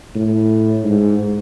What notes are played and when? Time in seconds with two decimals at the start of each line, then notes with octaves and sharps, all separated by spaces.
0.15 A2
0.84 G#2